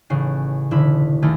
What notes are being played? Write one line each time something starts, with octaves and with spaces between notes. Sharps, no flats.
A1 C#3 C7
E1 D3 E4 B5
D#2 D#3 A3 G#4